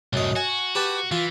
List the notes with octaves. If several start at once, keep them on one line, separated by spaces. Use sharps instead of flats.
C2 F#2 A2 D#5
F#4 G#5
G4 B4 A5
E3 F4